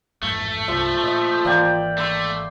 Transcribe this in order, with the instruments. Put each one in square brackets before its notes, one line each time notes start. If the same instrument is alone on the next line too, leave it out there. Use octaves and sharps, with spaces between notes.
[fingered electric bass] A1 F2 G#2 [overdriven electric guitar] A3
[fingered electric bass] C2 G2 [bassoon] F3 [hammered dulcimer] E5
[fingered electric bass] A#2 [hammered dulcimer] D#5 E5
[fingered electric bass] G#1 E3 [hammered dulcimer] A#3 D5 G5
[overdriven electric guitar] A3 [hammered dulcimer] C6 D6